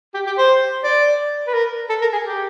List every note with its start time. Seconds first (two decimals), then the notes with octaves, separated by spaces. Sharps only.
0.14 G4
0.27 G4
0.38 C5
0.84 D5
1.47 B4
1.54 A#4
1.89 A4
2.01 A#4
2.12 G#4
2.24 G4